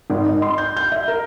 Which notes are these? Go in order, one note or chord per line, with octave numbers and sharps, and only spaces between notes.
G#1
D#5
C6
G6
G6
E5
A#4